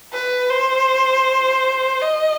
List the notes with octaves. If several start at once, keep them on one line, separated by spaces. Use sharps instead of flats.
B4
C5
D#5